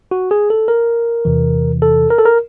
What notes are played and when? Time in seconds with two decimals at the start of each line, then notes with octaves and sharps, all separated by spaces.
0.11 F#4
0.31 G#4
0.50 A4
0.68 A#4
1.25 E2 C3 E3
1.82 A4
2.10 A#4
2.19 A4
2.25 A#4